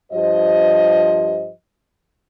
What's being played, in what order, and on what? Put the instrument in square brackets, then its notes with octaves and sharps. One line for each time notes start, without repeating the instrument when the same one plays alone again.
[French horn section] G2 F3 G4 C5 D#5